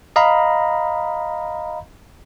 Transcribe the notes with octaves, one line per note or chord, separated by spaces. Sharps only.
D#5 F5 A#5 B5